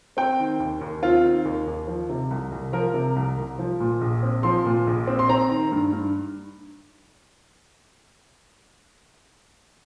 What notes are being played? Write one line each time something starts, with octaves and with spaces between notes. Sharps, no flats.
C4 G5
D#3
D#2
D#2
C4 F4
D#3
D#2
D#2
F3
C3
C2
C2
F3 A#4
C3
C2
C2
F3
A#2
A#1
C4
F3 C6
A#2
A#1
C4
C6
C4 A#5
D#3
G2
G2